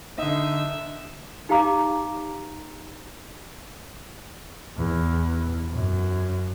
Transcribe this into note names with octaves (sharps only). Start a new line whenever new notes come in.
D3 D#4 E5
D#4 G4 F5 A#5 D6
E2
F#2